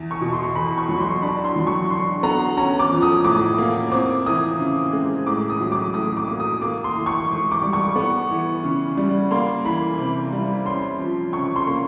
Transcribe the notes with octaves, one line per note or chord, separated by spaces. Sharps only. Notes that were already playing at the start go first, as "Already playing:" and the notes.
Already playing: E2
C#6
B2
C6
E2 B5
C#6
F#3
C6
D4 B5
C6
F#3
C#6
D3 C6
B3 A#5
C#4 A#5
D6
F3
D#6
A2 D6
A#3
C4 D6
E3 D#6
C#3
G#3
A2 D6
D#6
F#3
D6
A2 D#6
D6
A#3
D#6
A#3 D6
C6
E3
C#6
G#2
D6
G3
C#6
B3
E3
C#3
G3
A#3 C6
E3 B5
C3
G3
C#4 C6
F3
C#3 C#6
C6
A#3